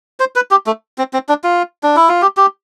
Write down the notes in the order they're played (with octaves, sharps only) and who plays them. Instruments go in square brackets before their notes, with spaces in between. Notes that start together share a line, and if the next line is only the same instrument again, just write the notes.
[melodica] C5
B4
G4
A3
C4
C4
D4
F4
D4
E4
F4
G4
G4